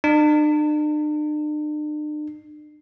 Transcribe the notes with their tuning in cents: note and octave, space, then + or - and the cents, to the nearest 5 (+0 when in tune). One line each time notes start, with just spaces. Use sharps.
D4 +45